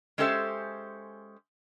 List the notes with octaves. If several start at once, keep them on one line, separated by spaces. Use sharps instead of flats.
G#3 C#4 G4 A4 C5 E5